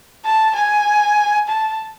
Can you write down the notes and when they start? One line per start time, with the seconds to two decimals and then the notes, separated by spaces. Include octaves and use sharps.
0.25 A5
0.56 G#5
1.48 A5